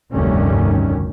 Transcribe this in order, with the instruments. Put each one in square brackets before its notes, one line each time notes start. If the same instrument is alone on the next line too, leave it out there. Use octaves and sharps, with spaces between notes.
[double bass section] F1 D2 G2 D#3 C#4